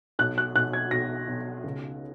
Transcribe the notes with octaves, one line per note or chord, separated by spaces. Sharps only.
B1 F#6
F#6
B1 F#6
G#6
B1 A#6
B1
C#2